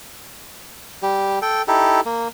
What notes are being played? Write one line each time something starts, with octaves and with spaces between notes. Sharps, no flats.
G3 G4
A4 G5
D#4 E4 G4 A4
A#3